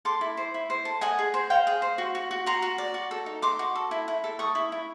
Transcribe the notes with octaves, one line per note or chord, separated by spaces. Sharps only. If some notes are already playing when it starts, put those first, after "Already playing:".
A4 C6 D6
E4
C5
E4
C5
A4
D#5 F#5 G#5
G#4
C5
C5 F5 G5
G#4
C5
F#4
F#4
F#4
F#4 A#5 C6
F#4
D5
F#4
A4
D#4
D#4 C6 D6
F#4
A4
E4
E4
A4
A4 C#6 D#6
E4
E4